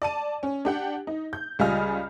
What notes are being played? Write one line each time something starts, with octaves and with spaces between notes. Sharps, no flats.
D5 A5 D#7
C#4
D4 G4 F#5
D#4
G6
C#2 G3 F4 D#5 G#5 F6